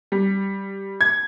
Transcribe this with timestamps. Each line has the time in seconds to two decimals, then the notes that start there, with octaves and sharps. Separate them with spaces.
0.12 G3
1.01 G#6